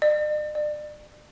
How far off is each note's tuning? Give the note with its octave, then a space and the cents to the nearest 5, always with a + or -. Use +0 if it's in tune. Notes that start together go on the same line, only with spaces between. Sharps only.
D5 +45
D5 +35